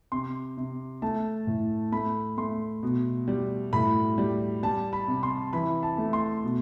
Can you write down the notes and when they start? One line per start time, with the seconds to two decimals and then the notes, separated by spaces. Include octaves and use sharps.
0.12 C3 C6
0.57 C3
1.02 A3 A5
1.47 A2
1.92 A3 B5
2.38 A3 C6
2.83 B2
3.28 G3
3.73 A2 B5
4.18 G3
4.63 G3 A5
4.93 B5
5.08 C3
5.23 C6
5.53 E3 B5
5.83 A5
5.98 A3
6.13 C6
6.44 B2